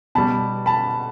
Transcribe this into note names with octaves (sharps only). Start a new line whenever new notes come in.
B2 G3 A5 B5
A5 B5